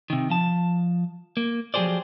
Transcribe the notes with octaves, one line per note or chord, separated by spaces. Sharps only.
C3 D#3
F3 A5
A#3
F3 F#3 G4 G#4 C5 D5